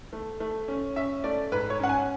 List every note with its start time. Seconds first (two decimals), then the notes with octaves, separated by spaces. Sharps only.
0.13 A3
0.40 A3
0.68 C#4
0.96 C#4 E5
1.24 A3 D5
1.52 G#2 B4
1.70 C#5
1.80 C#4 F#5
1.89 G#5